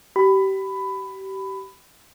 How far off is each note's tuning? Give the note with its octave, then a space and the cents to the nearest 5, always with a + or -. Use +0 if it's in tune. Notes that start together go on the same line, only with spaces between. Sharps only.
G4 -30 B5 +15